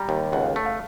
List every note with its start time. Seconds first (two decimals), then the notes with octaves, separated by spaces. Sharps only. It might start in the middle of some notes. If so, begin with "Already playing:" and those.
Already playing: G3 A#5
0.09 D#2
0.32 C#2 F#5
0.43 F5
0.55 A3 E5
0.66 F5